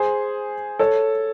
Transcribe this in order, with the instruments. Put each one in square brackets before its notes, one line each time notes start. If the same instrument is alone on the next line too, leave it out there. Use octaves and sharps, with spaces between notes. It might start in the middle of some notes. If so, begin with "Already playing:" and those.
Already playing: [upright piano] G#4 C5
A4 C#5